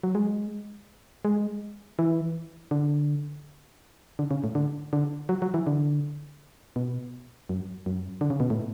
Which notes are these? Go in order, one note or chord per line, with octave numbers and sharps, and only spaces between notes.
F#3
G#3
G#3
E3
D3
D3
C#3
A2
D3
D3
F#3
F#3
E3
D3
B2
F#2
F#2
D3
C#3
B2
A2